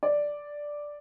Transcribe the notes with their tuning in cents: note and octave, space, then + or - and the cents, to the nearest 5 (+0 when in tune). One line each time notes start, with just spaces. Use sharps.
D5 +0